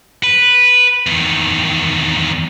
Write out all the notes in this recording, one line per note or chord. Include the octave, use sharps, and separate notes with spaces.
B4
E2 D#3